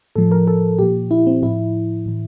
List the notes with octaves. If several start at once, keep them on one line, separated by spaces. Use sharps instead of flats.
A2 F3 A4
A#4
A4
A#2 F3 G4
E4
C4
A2 F3 E4
A2 E3